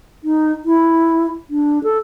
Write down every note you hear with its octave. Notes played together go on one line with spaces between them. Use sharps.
D#4
E4
D4
A4